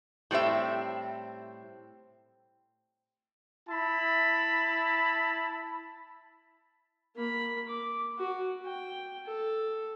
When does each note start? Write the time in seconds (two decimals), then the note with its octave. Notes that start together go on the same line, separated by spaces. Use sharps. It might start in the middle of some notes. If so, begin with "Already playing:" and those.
0.31 A2 G3 C4 E5
3.68 E4 A5 B5
7.16 A#3 B5
7.69 D6
8.18 F#4
8.65 G5
9.26 A4